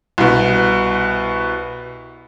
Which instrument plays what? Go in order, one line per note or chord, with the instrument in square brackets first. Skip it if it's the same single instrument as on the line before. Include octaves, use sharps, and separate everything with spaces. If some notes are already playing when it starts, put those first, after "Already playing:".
[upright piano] C2 B2